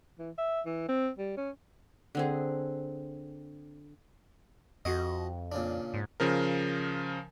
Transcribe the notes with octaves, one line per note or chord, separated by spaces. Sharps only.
E3
E5
E3
C4
G3
C#4
D3 C4 G#4
F2 F#4 D#5
A#2 C#3 D4
G#2
C#3 F3 A#4